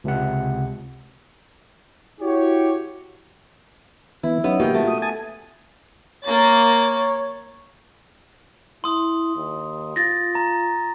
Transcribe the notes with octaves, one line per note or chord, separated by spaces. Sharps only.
C#2 C3 F#5
E4 F#4 G4 C#5
E3 B3 E4
F#3 B3 C#4 D#4
B2 D#3 A#3 F4 G4 G5
A3
D#6
G#5 A5 D#6
A#3 C#5 A6
E4 C6 D#6
D#2
F4 A6 A#6
A#5